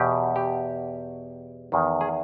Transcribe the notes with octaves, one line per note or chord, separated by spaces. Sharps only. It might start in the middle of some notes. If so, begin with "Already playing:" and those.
Already playing: E2 B2 G4
G4
E2 D#3
G#4